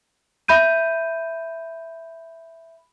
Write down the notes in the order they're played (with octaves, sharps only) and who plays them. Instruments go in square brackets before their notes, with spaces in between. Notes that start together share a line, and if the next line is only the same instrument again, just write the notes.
[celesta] E5 B5 G6 D#7